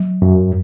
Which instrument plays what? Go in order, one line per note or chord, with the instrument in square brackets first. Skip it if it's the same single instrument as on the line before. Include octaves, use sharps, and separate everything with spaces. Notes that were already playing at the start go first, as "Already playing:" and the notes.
Already playing: [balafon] F#3
[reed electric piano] F#2